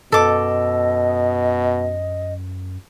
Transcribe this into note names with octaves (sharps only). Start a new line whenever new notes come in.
F#2 B2 A4 D#5 D6